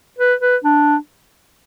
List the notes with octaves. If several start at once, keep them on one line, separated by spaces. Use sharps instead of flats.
B4
B4
D4